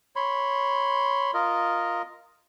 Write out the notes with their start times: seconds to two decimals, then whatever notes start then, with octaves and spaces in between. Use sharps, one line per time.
0.16 C#5 B5 C6
1.34 F4 A#4 D#5